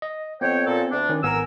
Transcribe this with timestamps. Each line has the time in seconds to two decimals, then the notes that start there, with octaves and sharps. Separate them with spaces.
0.02 D#5
0.41 F2 B3 C4 C#5 G5
0.67 A#2 A4
0.91 D2 D4
1.09 D#3 C#4
1.24 G#1 B3 A#4 G#5 E6